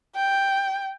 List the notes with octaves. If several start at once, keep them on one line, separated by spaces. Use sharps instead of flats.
G5